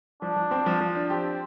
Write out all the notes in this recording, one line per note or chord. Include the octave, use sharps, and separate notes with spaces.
F3 D4
F3
C4
F3
F3
D4
C4 G4